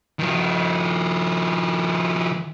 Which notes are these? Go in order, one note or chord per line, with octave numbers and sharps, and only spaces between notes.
D#3 F3